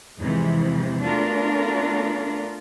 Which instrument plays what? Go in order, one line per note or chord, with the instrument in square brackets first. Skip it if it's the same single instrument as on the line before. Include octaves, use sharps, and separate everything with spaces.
[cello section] E2 G#2 C3 E3 F3
A3 B3 D4 F4 F#4 A#4